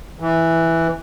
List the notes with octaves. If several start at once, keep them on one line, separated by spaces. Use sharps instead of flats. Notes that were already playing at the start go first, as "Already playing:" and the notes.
E3